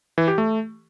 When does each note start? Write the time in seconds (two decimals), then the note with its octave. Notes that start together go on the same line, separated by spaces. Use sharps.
0.18 E3
0.28 G4
0.38 A3